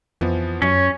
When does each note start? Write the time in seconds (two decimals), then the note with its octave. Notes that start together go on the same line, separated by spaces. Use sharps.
0.21 F2 E3 F3 B3
0.62 F#2 C#4 C#5 C#7